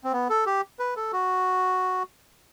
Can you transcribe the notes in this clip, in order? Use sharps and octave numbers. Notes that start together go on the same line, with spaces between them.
C4
B3
A4
G4
B4
A4
F#4